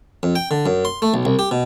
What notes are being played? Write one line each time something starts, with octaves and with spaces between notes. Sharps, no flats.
F2
G5
D3
F#2
C6
A3
B1
C2
G4
B2